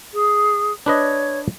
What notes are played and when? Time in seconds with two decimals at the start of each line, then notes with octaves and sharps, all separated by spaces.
0.13 G#4
0.86 D4 B4 C#5 D#5